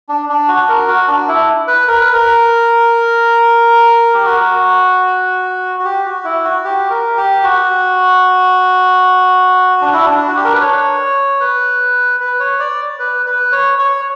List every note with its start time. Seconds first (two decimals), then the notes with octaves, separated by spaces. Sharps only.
0.09 D4
0.29 D4
0.48 F#4
0.69 A#4
0.88 F#4
1.08 D4
1.28 E4
1.67 B4
1.88 A#4
2.00 B4
2.13 A#4
4.14 G4
4.25 F#4
5.79 F#4
5.85 G4
6.05 F#4
6.24 E4
6.44 F#4
6.65 G4
6.90 A#4
7.17 G4
7.44 F#4
9.81 D4
9.93 E4
10.06 D4
10.28 F#4
10.37 G4
10.45 A#4
10.53 B4
10.61 C#5
11.40 B4
12.20 B4
12.40 C#5
12.60 D5
12.99 B4
13.26 B4
13.52 C#5
13.79 C#5